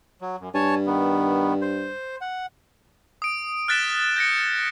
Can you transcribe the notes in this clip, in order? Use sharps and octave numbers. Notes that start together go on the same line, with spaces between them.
F#3
F#2
G2 C#5 G#5 A5
D#3 B3
C5
F#5
D#6 D7
F6 F#6 A6 B6 E7
G6 A#6 C#7